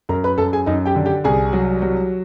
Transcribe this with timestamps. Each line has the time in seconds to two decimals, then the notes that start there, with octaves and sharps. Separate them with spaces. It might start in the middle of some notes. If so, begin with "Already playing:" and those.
0.09 F#2 A#4 A#5
0.24 B4 B5
0.38 F#2 A4 A5
0.53 G#4 G#5
0.66 F#2 D#4 D#5
0.86 G4 G5
0.96 D3
1.05 G4 G5
1.24 C2 G#4 G#5
1.53 F#3
1.82 F#3